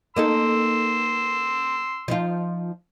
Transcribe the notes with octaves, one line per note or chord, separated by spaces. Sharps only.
A#3 D#4 A4 C6 E6
F3 D#4 F4